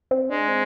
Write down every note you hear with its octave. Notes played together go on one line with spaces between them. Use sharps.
C4
G#3 D4
C4